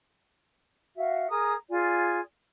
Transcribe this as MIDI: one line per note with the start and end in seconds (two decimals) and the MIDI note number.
0.97 1.28 66
0.97 1.28 76
0.97 1.28 77
1.29 1.54 68
1.29 1.54 70
1.29 1.54 82
1.29 1.54 87
1.70 2.19 65
1.70 2.19 68
1.70 2.19 74
1.70 2.19 80